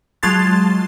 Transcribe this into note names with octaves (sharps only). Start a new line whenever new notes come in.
F#3 G#3 F4 A5 C6 A6